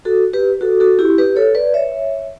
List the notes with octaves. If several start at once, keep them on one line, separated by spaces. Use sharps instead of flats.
F#4 A4
G4 B4
F#4 A4
F#4 A4
E4 G4
G4 B4
A4 C#5
B4 D5
C#5 E5